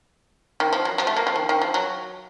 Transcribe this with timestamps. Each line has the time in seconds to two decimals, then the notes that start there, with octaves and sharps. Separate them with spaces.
0.60 D#3
0.73 F3
0.85 F#3
0.98 F3
1.07 A3
1.16 A#3
1.27 F3
1.36 D#3
1.49 D#3
1.62 F3
1.74 F#3